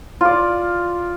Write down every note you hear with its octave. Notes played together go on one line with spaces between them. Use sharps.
F4 D5